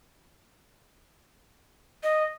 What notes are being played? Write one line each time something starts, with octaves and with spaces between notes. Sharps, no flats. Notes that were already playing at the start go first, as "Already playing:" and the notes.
D#5